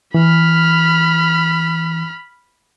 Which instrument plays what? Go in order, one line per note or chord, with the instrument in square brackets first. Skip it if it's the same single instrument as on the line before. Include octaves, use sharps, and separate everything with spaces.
[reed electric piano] E3 [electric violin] B5 F6